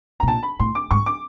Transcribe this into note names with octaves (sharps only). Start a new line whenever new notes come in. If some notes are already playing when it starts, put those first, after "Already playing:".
A#5
B2
A#2 A5
B5
A2 C6
D6
G#2 C#6
D6